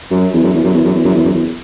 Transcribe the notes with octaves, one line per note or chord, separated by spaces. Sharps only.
F#2
E2
F#2
E2
F#2
E2
F#2
E2
F#2
E2
F#2
E2